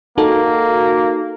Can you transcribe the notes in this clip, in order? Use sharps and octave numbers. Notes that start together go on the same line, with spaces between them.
A#3 D#4 F#4 A4